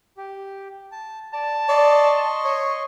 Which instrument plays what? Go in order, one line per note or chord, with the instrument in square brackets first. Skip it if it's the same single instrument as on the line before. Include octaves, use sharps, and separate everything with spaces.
[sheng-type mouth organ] G4
A5
[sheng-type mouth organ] D5 [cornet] A5
[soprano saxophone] D5 [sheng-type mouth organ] D#5 C6 C#6
[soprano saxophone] C#5